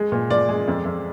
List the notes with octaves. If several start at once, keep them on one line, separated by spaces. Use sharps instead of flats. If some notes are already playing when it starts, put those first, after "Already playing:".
Already playing: G#3
A#2
A#2 D5
G#3
F2
F2